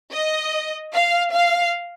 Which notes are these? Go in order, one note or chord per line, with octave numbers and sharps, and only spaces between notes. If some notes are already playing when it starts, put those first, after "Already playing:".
D#5
F5
F5